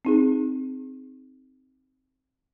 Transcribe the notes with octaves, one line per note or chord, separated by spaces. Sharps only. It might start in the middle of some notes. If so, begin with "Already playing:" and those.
C4 D#4 G#4